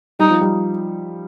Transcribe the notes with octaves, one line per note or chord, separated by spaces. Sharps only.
G3 D#4
F3
G3